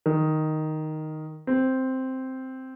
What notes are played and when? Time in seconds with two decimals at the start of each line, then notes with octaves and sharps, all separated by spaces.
0.06 D#3
1.47 C4